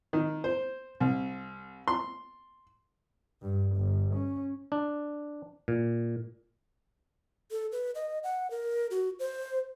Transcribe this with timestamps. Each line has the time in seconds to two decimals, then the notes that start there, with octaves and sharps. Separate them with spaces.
0.13 D#3
0.44 C5
1.00 C2
1.88 C6
3.42 G2
3.76 G1
4.14 C#4
4.72 D4
5.68 A#2
7.51 A4
7.72 B4
7.95 D#5
8.24 F#5
8.51 A#4
8.91 F#4
9.19 C5